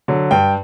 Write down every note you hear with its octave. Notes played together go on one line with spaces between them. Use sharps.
D3 F#3
G2 G5